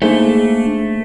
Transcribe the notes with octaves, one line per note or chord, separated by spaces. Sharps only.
G#2 A3 A#3 D4